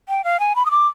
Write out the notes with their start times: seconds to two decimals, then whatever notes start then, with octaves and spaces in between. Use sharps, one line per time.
0.09 G5
0.24 F5
0.40 G#5
0.56 B5
0.66 D#6
0.71 D6